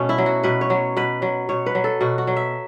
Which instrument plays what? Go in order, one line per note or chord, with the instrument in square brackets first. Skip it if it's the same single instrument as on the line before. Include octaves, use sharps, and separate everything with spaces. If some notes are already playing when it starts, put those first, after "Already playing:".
Already playing: [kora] B2 A3 B3 C#4
E4
F#3
F#4
B2 B4
C#5
F#3
B2 B4
F#3
B2 C#5
B4
F#3
A4
B2 F#4
F#4
F#3
E5